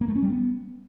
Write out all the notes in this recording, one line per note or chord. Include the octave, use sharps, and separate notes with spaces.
A#3
A3
C#4
G3
B3